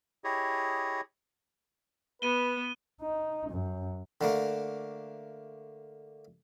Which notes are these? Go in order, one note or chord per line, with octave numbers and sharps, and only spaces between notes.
E4 G4 G#4 C#5 D#5
B3 B4 D#7 G7
D#4
F#2
D3 A3 A#3